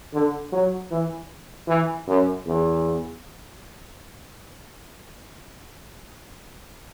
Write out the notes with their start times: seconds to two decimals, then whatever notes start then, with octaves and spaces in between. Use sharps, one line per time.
0.14 D3
0.52 F#3
0.91 E3
1.68 E3
2.08 F#2
2.46 E2